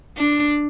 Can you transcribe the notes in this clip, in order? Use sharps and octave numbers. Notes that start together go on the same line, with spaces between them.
D4